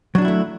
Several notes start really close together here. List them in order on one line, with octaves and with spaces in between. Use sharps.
F#3 D4 F#4 E4 A3